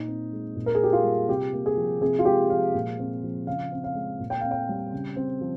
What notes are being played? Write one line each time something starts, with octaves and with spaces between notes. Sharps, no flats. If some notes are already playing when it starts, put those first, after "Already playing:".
Already playing: A#2 D#4
C4
G#3
A#2
A#4
G#4
A#3 G4
F4
G3
C3 G4
A#3
G#4
F3
C3 G#4
F4
G#3 G4
F3 F5
A#2
C4
F3
C#3 F5
C4
F5
G#3
A#2
G5
C4 F5
G5
G3
C#3
C4
F3